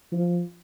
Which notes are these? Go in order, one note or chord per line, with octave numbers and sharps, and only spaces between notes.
F3